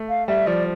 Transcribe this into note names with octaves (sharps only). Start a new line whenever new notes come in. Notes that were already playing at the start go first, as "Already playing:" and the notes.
Already playing: A3
F5
G3 E5
F3 D5